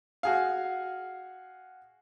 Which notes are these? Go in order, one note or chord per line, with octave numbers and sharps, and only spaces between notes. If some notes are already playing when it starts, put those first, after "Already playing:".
F#4 G#4 F5